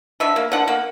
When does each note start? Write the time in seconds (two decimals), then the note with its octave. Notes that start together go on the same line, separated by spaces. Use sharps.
0.20 D3 E5
0.36 A#3
0.52 D3 F#5
0.68 A#3